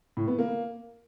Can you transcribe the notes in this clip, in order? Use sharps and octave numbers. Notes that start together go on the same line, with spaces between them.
A2
B3
A#3